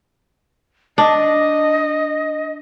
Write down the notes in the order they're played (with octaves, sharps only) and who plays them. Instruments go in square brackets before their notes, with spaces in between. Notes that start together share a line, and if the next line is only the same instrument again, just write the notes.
[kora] D4 [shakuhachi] D#5